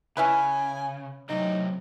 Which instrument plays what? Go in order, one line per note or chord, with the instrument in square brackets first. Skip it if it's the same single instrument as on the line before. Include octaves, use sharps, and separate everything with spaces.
[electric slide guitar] C#3 [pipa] C#4 E4 B4 [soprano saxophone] G#5
[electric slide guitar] A2 C3 C4 [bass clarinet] F#3 [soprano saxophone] D#4